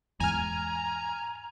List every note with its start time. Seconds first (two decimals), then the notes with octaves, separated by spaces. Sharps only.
0.20 E2 G#2 G#5 A#5 F6